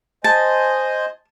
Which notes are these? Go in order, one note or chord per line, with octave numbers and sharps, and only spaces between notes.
C5 D#5 G#5 A5